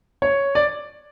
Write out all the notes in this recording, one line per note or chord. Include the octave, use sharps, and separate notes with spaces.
C#5
D5